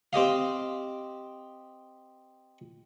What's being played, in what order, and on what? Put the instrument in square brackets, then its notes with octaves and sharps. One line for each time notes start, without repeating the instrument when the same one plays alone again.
[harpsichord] C4 G4 D#5 F5